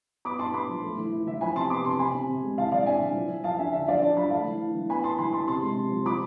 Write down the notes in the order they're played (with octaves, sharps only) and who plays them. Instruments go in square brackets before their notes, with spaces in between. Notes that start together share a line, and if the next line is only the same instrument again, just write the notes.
[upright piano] B3 B5 D6
B3 A5 C6
B3 B5 D6
F3
A3
E3
E4
E3 E5
F3 G#5 B5
C3 A5 C6
B3 B5 D6
C3 A5 C6
C3 G#5 B5
C3
C3
G#3
E3 F5 A5
E3 D5 F5
D4 E5 G#5
E3
F3
F3
F3 F5 A5
D4 E5 G#5
D3 E5
F3 D5 F5
D4 A5
F3 B5
A3 F5 A5
E3
E4
E3
B3 G#5 B5
B3 A5 C6
E3 G#5 B5
E3 A5 C6
C3 A5 C6
G#3
C3
F3
F3 B5 D6